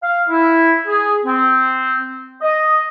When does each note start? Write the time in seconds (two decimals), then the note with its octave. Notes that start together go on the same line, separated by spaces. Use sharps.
0.03 F5
0.28 E4
0.86 G#4
1.24 C4
2.41 D#5